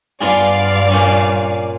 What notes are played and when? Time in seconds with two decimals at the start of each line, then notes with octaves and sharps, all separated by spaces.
0.20 G2 B3 F4 G#4 D5 F5
0.90 A#2 C#4